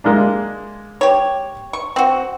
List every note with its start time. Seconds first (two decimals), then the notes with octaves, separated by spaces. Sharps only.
0.04 G#3 A#3 D4
1.01 G4 C#5
1.73 C#6
1.96 C4 F#4